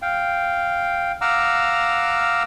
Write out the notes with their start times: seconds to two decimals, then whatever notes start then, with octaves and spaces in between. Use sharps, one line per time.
0.02 F5 G5
1.21 F5 F#5 A#5 D6 E6 F6